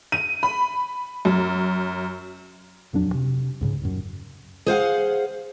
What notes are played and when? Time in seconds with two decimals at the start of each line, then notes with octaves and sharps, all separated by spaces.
0.12 D#7
0.43 B5
1.25 F#2
2.93 D#1 F2 F#3 D4
3.14 C3
3.61 C#2 G#2 C#3
3.81 D#1 F#2
4.66 G#4 C5 F5 F#5